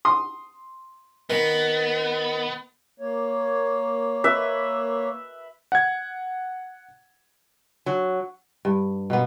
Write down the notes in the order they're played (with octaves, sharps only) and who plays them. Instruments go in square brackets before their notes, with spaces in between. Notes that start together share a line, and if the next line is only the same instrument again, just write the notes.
[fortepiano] C6 D#6
[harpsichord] D#3 [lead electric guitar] B3
[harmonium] A#3 C#5
[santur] B4 E5
[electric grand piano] F#5 G#6
[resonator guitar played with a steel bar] F#3
[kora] G2
B2 A#3 B3